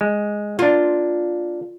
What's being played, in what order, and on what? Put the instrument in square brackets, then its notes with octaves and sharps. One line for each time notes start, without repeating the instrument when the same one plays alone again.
[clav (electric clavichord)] G#3
[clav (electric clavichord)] A#3 D4 [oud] F4